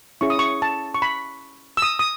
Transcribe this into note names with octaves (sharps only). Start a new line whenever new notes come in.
C#4 E4 G#4 C#6
D#6
C#6
A5
C#6
B5
E6
D#6
D#6